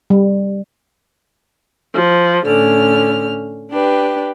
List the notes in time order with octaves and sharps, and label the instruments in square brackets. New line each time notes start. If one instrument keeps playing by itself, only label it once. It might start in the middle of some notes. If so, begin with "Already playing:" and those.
[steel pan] G3
[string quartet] F3
A2 D3 C#4 F6
D4 G4 B4